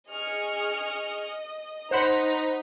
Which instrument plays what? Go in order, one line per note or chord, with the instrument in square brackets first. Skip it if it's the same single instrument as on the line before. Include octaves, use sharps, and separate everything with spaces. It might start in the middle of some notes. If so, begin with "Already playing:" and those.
[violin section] G#4 C#6 F6 [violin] D#5
[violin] D#4 B6 [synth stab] C5 F#5 B5 [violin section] A#5